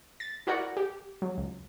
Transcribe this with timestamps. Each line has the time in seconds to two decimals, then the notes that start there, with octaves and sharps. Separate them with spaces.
0.20 A6
0.47 E4 F#4 A#4 D5 F#5
0.77 G4
1.22 F#3
1.38 C#2